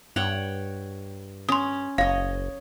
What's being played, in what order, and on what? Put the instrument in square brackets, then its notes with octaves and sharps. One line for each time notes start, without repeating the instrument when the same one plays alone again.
[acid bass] G2 [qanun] C#5 F#5 G5
[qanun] C#4 [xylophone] C6 D#6
[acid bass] F#1 [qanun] C#5 D#5 [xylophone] F5